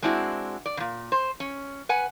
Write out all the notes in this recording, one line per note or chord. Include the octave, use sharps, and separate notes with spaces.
G#3 C4 D4 E4 F#4
D5
A#2 C#3
C5
C#4
B4 F#5 G#5